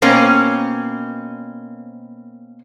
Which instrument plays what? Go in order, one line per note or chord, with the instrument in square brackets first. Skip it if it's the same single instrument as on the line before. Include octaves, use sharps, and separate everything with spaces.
[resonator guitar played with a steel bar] B2 A#3 C4 C#4